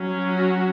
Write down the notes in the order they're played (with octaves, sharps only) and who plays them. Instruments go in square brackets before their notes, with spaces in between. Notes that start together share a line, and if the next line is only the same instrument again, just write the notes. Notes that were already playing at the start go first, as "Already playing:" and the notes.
Already playing: [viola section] F#3 C#4
F#4